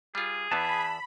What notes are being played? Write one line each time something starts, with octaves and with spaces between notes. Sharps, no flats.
G3 F4 G#4
E2 E3 B3 A5 B5